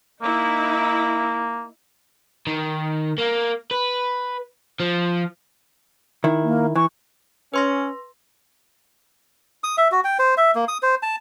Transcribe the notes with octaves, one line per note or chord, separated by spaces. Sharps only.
A#3 D#4 E4
D#3
A#3
B4
F3
D#3 E4
A#3
E3 C#6
C#4 B4 C6 A#6
D#6
E5
F#4
G5
C5
E5
A#3
D#6
C5
A5